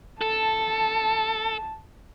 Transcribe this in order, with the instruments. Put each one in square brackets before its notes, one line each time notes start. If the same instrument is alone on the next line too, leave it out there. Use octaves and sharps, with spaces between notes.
[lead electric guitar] A4 [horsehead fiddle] A5